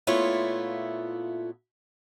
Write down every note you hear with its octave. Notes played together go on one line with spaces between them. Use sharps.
A#2 A3 B3 E4 F4 C#5